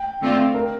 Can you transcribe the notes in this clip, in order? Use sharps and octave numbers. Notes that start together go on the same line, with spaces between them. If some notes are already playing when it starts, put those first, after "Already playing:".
Already playing: G5
D3 A3 C4 F4
A#4